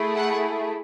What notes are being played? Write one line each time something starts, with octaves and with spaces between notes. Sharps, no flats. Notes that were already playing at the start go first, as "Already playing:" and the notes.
Already playing: A3 E4 G#4
F#5